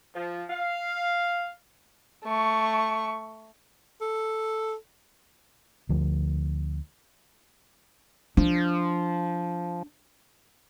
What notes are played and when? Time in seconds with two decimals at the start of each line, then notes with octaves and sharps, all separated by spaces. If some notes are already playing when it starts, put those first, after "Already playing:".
0.15 F3
0.50 F5
2.25 A3 C#6
4.01 A4
5.89 D2 F3
8.37 F3 D4